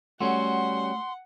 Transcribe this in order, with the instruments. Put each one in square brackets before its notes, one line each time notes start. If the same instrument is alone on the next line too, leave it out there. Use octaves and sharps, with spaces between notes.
[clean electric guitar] G3 C#4 F#4 [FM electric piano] A3 [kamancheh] F#5 [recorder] C6